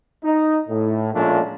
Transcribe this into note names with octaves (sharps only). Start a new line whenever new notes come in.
D#4
A2
A#2 F3 G#3 A3 C#4 D4